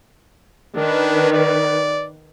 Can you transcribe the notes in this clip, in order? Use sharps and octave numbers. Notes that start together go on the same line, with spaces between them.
D#3 D4 B4
D5